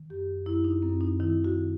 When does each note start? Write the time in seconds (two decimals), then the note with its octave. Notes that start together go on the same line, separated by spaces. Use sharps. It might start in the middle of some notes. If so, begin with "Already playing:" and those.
Already playing: D#3
0.10 F#2 G4
0.46 F#2 E4
0.64 D#4
0.82 F#2 C4
1.01 D#4
1.20 D#3 E4
1.45 F#4